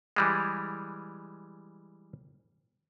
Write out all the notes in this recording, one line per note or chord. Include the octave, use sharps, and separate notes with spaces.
E3 G3 G#3